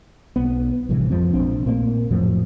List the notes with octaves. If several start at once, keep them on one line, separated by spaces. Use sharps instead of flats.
B1 B3
A1 G2 C3 E3
F2 F3 G#3 C4
A#1 C4 D4
A#2 A3 A#3 C4
F2 A2 F3 F#3